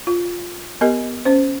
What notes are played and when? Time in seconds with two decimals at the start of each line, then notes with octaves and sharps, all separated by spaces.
0.07 F4
0.81 B3 G4 A#4 D#5
1.25 C#4 C5